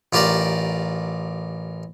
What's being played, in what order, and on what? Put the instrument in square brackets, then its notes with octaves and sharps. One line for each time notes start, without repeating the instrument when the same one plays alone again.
[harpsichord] A1 F4 G4 A#4 D5